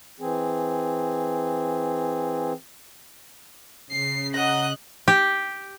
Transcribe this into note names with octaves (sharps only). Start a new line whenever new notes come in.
E3 C4 G#4
C#3 C7
D#5 F#5 A#5 F#6
G4